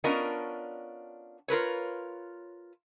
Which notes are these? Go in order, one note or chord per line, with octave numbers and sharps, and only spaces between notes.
B3 C#4 D4 F4 A#4 D#5
F4 A#4 B4 C#5